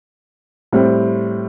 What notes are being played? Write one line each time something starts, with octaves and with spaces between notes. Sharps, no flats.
A2 G3 C4